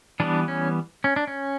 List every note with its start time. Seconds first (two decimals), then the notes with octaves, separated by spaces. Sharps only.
0.20 E3 G3 B3 D4
0.48 C#4
1.04 C#4
1.16 D4
1.27 C#4